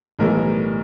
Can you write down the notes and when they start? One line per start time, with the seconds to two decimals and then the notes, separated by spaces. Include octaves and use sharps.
0.19 B1 A2 E3 G3 A#4